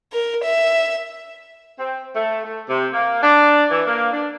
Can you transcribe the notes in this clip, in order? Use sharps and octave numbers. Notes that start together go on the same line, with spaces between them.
A#4
E5
C4
A3
A3
C3
A#3
D4
E3
A#3
D4